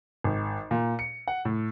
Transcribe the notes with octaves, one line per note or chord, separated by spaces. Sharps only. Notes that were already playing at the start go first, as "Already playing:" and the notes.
G#1
A#2
C#7
F#5
A2